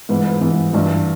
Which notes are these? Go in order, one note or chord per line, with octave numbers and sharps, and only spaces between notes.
G#2 E3 B4
B4
G#2 E3
G2 E3